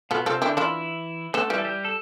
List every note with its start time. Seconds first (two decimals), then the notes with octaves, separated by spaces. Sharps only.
0.11 B2 B3 F4 A4
0.26 C3 C4 F4 A4
0.41 D3 D4 E4 G4
0.57 E3 D4 E4 F4
1.34 A3 B3 D4 A4
1.50 E3 G3 G4
1.58 A4
1.65 G3 G4
1.85 A4